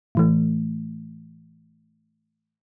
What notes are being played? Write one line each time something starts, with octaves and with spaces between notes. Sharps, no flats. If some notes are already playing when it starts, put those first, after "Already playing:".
A2 E3 A3